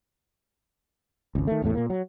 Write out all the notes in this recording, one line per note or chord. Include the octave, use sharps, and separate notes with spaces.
G#1 C#2
D#3 A3
A1 E2 A2 A3
A#2 A#3
F#3